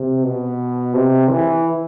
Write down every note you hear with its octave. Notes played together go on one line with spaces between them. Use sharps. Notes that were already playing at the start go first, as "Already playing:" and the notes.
Already playing: C3
B2
C3
E3